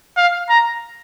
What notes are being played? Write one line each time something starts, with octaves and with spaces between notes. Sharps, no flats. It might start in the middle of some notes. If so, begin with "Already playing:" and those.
F5
A#5